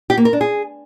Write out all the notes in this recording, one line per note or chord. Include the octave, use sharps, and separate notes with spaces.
G4
A#3
A#4
D4
G#4